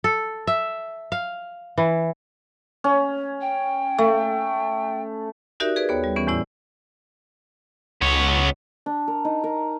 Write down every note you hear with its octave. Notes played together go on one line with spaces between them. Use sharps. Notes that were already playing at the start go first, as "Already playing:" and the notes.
A4
E5
F5
E3
C#4
G5
A3
D#4 F#4 G4 A#4 D5 E5
G#4 B4 D5
D#2 B3 C#5
G3
E3 B3 C#4
E2 A2 E4 D5
C#2 B3 C#5
D4
A#4
D#4
A#4